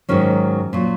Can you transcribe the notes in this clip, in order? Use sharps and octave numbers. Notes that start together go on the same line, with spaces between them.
G#2 D#3 F#3 C#4
A#2 F#3